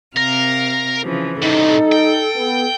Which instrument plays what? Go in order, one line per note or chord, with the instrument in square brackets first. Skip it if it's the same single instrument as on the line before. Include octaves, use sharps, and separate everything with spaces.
[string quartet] C3 F5 [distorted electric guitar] A#4
[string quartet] C#3 E3 F3
[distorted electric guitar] A2 C3 [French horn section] G3 D#4 [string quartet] A4
[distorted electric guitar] G5
[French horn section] B3